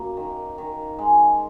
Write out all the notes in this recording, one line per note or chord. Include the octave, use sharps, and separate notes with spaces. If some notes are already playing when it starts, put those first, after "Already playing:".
Already playing: F#2 A#3
D#3
D#3
G#3